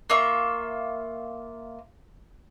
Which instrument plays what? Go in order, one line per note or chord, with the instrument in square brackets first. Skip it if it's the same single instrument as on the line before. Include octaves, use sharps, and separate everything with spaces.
[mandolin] A#3 F4 E5 C#6